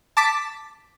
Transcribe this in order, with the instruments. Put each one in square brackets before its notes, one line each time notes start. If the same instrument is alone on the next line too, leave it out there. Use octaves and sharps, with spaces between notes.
[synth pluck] A5 D6 A6 B6